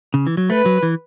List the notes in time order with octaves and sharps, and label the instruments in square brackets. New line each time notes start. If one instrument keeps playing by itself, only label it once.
[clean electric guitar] C#3
E3
F#3
[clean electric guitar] A3 [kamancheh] B4
[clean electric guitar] F#3
E3